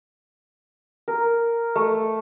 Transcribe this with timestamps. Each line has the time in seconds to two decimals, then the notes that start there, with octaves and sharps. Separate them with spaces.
1.08 A#4
1.76 A3